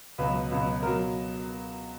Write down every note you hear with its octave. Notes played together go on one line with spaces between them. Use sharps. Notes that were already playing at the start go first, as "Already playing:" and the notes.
C#2 B2 F#3 B4
C#2 B2 F#3
B2 F#3 A#4